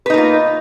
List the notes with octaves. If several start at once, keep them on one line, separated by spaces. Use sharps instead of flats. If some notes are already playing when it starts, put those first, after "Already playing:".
A#3 D#4 F4 B4